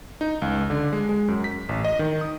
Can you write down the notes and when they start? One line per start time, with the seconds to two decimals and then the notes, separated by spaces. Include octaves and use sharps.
0.21 D#4
0.42 C#2
0.70 D3
0.93 G#3
1.09 G#3
1.28 F#2
1.44 B6
1.69 A1
1.85 D#5
1.99 D#3
2.21 D#6